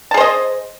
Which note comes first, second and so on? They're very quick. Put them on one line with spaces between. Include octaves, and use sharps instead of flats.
A5 G#4 C5 D#5